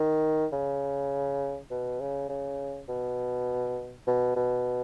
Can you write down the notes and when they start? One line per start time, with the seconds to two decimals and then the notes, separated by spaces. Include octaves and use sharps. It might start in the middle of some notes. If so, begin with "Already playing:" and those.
Already playing: D#3
0.52 C#3
1.70 B2
2.00 C#3
2.29 C#3
2.89 B2
4.07 B2
4.36 B2